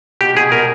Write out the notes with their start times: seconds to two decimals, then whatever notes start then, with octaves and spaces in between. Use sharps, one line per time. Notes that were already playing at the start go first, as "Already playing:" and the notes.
0.21 B2 G4
0.37 B2 G#4
0.52 B2 A#4